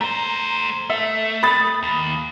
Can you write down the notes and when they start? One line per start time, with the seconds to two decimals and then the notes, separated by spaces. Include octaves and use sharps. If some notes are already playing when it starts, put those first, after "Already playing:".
0.01 A3 C5 A#5
0.90 A3 E5
1.43 B5 D#6 A6
1.83 D#2